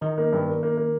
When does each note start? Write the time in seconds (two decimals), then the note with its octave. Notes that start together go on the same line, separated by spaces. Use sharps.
0.01 D#3 D#4
0.18 A#3
0.32 G2
0.48 A#3
0.63 A#3
0.77 A#3